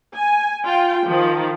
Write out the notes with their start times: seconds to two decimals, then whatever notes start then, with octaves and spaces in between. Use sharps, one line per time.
0.14 G#5
0.64 F4 G5
1.08 D#3 F3